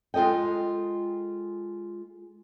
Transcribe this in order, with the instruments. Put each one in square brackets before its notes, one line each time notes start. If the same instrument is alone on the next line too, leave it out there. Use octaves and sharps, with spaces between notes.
[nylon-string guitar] G#3 F4 A4 D#5 G5